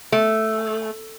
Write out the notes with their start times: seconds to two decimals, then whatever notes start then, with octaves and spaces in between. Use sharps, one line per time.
0.12 A3